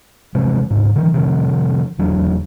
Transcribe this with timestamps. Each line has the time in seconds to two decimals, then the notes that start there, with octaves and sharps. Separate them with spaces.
0.35 C3 F3 G#3
0.70 D2 G#2
0.96 D3 E3
1.14 C3 D#3 F3
1.99 E1 F#3 D4